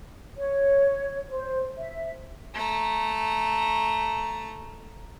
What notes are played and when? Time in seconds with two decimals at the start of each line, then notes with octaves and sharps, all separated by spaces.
0.38 C#5
1.30 C5
1.77 E5
2.54 A3 A#5